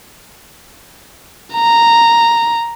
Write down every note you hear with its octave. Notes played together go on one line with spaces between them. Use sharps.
A#5